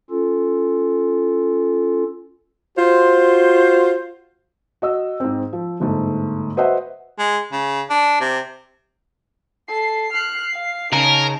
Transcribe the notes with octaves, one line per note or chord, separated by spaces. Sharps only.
C#4 F4 A4
F4 F#4 C5
F#4 D#5 E6
G#2 C4
F3
G1 G#2 A3
F#4 B4 C5 D#5 E5 F#5
G#3
C#3
D4
C3
A4 C7
F6 F#6
F5
C#3 D#4 A#4 A5